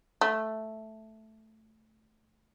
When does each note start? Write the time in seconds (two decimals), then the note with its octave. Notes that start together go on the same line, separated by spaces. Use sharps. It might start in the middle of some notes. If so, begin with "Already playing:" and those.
0.21 A3